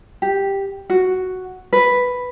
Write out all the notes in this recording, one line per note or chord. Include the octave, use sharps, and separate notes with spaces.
G4
F#4
B4